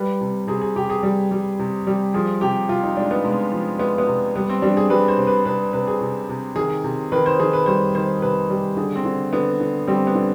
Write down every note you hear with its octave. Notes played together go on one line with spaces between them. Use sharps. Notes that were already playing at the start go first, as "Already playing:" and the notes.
Already playing: G3 B4
C3
C3 G#4
G#4
C3 G4
G#4
G3
G3
C3
G3
F3 G#4
C3 G4
C3 F4
D#4
G#3 D4
B3
C3 G#3
F3
G#3 B3
B3
C3
G3 B3
C4
G3 D4
G#4
G3 B4
C5
C3
B4
C3 B4
C3 B4
G#4
C3
C3
D#3 G#4
C3
D#3 B4
C5
D#3 G#4
B4
G3 C5
D#3 C5
C3 B4
G3
D3 G#4
C4
D3
D3 B3
D3
G3 C4
B3
D3